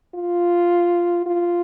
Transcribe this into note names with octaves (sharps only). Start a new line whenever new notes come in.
F4
F4